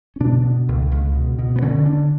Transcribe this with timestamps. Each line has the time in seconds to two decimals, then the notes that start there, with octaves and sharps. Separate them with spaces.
0.16 C#4
0.20 B2 D4
0.44 B2
0.68 C#2
0.92 C#2
1.15 B2
1.39 B2
1.56 B3
1.62 D3 C#4
1.86 D3 D4